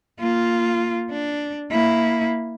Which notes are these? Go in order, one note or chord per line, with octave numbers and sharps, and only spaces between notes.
A#3 F4
D4
A#3 E4